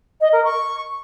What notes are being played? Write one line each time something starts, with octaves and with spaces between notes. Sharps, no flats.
D#5
A#4
C#6